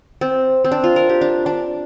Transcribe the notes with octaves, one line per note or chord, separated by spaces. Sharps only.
C4
C4
D4
F4
A#4
G4
D4
D4